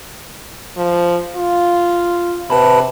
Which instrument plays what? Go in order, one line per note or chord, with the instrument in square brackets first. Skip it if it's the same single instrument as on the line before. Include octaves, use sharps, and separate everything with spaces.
[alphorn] F3
F4
[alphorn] C3 [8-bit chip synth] B4 A5 B5